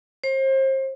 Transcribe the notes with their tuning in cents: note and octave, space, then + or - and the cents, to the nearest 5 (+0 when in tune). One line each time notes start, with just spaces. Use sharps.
C5 +35